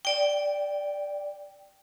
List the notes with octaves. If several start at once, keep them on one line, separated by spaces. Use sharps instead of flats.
D5 G5